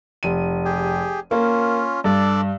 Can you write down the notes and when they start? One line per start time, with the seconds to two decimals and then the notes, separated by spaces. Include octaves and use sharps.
0.23 F1 D#7
0.65 G4 G#4
1.31 A#3 C#4 F4
2.04 G2 D4 A4 D5